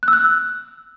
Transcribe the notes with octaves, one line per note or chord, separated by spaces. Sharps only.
F#6
E6
F#6